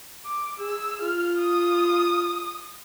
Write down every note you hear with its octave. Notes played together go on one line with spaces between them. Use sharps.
D6
G#4 E6
F4 F6
D#6